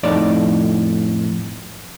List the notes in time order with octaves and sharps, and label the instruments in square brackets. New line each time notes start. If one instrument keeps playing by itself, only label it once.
[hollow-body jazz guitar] F2 A2 D#4 D5